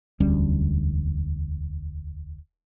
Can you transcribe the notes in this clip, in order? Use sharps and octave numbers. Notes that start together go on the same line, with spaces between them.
E1 D2 G3 C#4